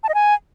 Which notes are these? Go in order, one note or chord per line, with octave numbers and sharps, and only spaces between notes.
A5
D#5
G#5